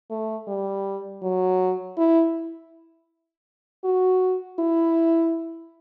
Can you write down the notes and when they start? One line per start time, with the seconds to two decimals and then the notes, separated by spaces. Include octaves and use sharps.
0.10 A3
0.47 G3
1.23 F#3
1.97 E4
3.84 F#4
4.59 E4